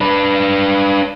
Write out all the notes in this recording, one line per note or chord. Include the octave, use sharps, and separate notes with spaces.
D4 B4